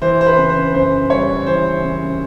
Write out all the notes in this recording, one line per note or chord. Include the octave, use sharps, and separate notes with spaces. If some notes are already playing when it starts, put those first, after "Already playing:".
E3 C5
C5
B4
C#3
C5
F#2 C5
G3 C#5
E3 C5
C#3